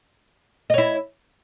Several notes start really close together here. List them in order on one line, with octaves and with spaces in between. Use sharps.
D#5 C#5 E4